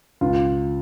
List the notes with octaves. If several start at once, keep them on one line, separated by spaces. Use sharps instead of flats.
C#2 F4